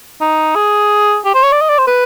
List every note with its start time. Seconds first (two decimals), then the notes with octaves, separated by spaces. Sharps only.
0.21 D#4
0.55 G#4
1.25 G4
1.35 C5
1.43 C#5
1.52 D5
1.61 D#5
1.69 D5
1.78 C5
1.87 B4